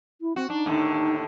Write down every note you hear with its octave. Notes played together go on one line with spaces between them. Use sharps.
E4
C4 F#4
D4 D#4
D#2 A2 D3